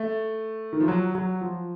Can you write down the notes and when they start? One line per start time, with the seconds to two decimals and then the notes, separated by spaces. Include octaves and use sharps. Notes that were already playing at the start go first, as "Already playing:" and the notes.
Already playing: A3
0.73 D#3
0.80 F3
0.88 F#3
1.15 F#3
1.41 F3